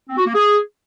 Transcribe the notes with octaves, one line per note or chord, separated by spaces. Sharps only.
C4
F#4
A#3
G#4